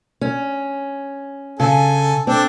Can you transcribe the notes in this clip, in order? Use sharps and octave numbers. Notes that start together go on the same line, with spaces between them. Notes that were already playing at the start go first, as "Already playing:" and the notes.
C#4
C#3 A4 G#5
C4 D4 A4